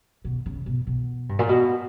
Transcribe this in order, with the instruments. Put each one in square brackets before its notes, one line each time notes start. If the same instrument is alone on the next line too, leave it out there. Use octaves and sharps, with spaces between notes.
[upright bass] B2
C#3
B2
B2
G2
A#2
B2